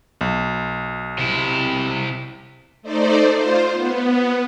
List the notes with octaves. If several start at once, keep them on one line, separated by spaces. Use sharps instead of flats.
B1
C3 E4
A3 D#4 C5 D5
F4 C5
B3